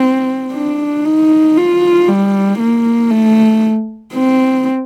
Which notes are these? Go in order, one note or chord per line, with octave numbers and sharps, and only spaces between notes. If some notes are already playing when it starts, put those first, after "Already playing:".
Already playing: C4
D4
D#4
F4
G3
A#3
A3
C4